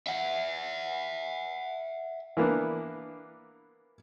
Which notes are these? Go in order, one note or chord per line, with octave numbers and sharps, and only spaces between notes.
E5 F#5
E3 A#3 B3 D4